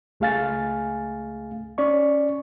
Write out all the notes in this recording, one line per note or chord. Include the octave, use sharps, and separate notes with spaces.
C#2 A3 G#4 F5 G#5 A6
C#4 D5 C#6